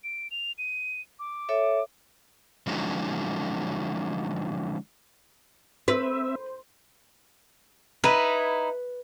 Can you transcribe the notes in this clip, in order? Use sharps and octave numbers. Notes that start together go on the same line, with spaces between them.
D7
F7
D#7
D6
A4 C#5 E5
D3 F3 F#3 G#3 C#4 D#4
C4 B4 C5 E5
D#4 E4 B4